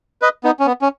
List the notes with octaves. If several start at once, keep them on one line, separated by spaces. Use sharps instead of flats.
B4 D#5
B3 D#4
C#4
B3
C#4